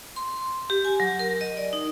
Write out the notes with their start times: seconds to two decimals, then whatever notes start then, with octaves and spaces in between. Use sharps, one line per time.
0.16 C6
0.70 G4
0.85 G#5
1.00 F#3
1.19 A#4
1.41 D#5
1.57 D5
1.73 D#4